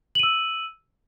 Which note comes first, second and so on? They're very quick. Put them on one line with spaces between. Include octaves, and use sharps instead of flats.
F#7 D#7 E6